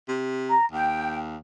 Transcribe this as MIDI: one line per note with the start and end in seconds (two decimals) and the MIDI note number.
0.08 0.55 48
0.49 0.64 82
0.72 1.36 39
0.72 1.16 79